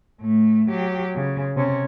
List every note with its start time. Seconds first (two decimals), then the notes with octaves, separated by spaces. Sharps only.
0.21 A2 A3
0.70 F#3 G4
1.16 C#3
1.56 C3 C#4